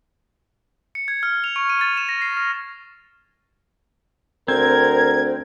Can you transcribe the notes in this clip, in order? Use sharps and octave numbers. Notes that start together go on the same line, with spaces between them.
C#7
G#6
F6
F7
C#6
D#7
A6
E7
A#6
C7
F6
D2 C4 A#4 G#6